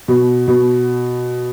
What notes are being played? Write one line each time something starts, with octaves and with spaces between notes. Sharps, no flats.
B2
B2